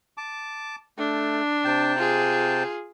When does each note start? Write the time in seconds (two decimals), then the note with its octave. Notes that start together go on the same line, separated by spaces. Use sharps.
0.18 A5 D6
0.98 A3 D4
1.65 C3 G5 A5
1.98 F4 G#4